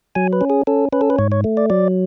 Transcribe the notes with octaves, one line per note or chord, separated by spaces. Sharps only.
F#3 G#5
B4
C#4
G#4
C#4 A4
C#4 B4
A4
B4
G#2 C#5
C#5
A3
D5
F#3 D5